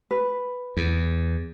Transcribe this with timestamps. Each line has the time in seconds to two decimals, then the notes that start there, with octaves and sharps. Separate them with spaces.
0.11 B4
0.77 E2